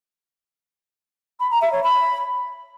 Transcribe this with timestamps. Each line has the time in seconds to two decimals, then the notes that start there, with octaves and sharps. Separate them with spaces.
1.40 B5
1.51 A#5
1.61 E5
1.72 C#5
1.83 B5